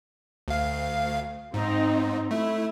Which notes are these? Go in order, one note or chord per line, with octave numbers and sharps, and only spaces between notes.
D2 F5
G#2 C4 D#4
A3 E4